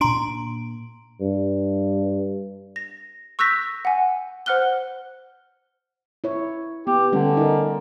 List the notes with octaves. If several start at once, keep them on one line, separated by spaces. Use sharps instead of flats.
A#2 D4 A#5 C6 D7
G2
A#6
C#6 E6 F#6 G6 A#6 B6
F#5 G#5
C5 F#5 F6 F#6 G7
E4 C#5
B3 G4
D3 G3 A3 C#4
D#4 A#4